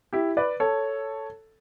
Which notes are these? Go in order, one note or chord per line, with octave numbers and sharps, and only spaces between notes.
E4 G4
B4 D5
A4 C#5